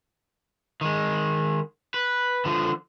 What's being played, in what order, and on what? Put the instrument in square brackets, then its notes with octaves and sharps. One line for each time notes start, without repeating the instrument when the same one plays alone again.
[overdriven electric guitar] D#3 G#3
B4
D3 F3